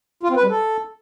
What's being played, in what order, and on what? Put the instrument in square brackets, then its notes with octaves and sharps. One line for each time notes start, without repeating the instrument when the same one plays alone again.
[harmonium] F4
C4
B4
G3
A4